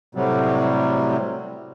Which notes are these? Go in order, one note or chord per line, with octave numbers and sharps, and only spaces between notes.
A2 C3 F#3 G3